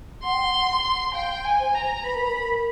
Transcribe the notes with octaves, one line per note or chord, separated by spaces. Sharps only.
F#5 C6
G5
F#5
F5 G5
G#5
C5
A#5
B4 B5
A#4
A#4